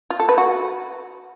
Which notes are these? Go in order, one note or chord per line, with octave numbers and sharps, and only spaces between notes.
F4
A4
B4
F#4